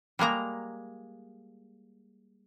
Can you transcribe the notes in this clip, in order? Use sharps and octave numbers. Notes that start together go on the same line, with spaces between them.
G3 G#3 A#3 A#5